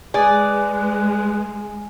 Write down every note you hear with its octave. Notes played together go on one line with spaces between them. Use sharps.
G#3 G#4 B4 D5 G#5